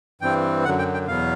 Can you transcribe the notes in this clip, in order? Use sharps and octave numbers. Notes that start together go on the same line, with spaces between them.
G2 E3 G3 C4 G5
F#2 D3 F#3 F#5
G5
G5
E2 B2 F#3 B3 F5